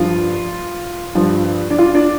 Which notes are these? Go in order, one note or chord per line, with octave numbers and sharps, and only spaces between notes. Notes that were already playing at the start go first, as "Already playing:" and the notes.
Already playing: G2 F3 F4
G2 F3
D4
F4
D4